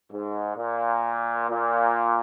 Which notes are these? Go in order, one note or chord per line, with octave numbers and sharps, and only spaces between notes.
G#2
A#2
A#2